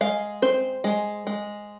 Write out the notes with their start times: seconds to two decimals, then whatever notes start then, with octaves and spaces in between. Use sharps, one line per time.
0.01 G#3 F5
0.42 C4 C5
0.84 G#3
1.27 G#3